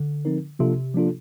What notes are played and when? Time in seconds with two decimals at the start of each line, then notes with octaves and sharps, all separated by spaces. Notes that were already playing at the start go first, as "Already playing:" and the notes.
Already playing: D3
0.25 F3 C4 D#4 A#4
0.59 C3 F3 A#3 D4 F4 A4
0.94 F3 A#3 D4 F4 A4